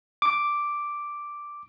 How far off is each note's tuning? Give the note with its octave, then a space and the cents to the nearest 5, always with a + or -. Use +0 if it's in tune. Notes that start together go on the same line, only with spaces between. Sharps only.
D6 +0